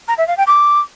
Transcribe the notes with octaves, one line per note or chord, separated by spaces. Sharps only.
A#5
E5
F5
G5
D6